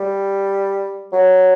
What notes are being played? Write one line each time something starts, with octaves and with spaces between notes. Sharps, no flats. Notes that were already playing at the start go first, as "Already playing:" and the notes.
Already playing: G3
F#3